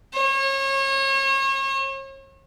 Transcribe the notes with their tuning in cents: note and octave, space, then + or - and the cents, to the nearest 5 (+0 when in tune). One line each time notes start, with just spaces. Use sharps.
C#5 -35